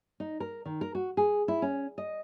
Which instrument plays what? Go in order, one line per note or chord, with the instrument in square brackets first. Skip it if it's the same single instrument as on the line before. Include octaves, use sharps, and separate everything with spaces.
[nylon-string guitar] D#4
A#4
D#3
A#4
F#4
G#4
E4
C#4
D#5